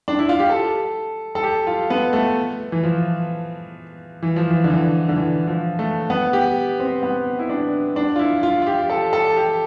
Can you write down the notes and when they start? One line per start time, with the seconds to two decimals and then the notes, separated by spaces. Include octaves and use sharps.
0.08 D4
0.19 E4
0.29 F4
0.40 G4
0.50 A4
1.35 A4
1.43 G4
1.67 F4
1.90 B3
2.13 A3
2.72 E3
2.83 F3
4.23 E3
4.36 F3
4.51 E3
4.64 D3
4.70 E3
5.09 D3
5.16 E3
5.47 F3
5.79 A3
6.10 B3
6.33 G4
6.80 C4
7.03 B3
7.39 E4
7.49 D4
7.96 D4
8.16 F4
8.19 E4
8.43 F4
8.62 F4
8.67 G4
8.90 A4
9.13 A4
9.36 G4